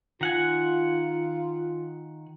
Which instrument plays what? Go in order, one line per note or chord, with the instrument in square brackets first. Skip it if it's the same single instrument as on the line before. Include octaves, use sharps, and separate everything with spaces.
[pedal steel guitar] D#3 F#5 G#5 [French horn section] F4